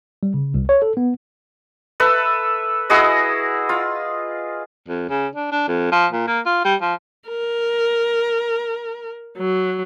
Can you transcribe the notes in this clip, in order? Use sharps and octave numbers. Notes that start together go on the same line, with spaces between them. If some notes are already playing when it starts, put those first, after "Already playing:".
G3
C#3
C2
C#5
A4
B3
A4 B4 E5
E4 F#4 G#4 D#5
F4
F2
C#3
D4
D4
F2
F3
A#2
A#3
F4
G3
F3
A#4
F#3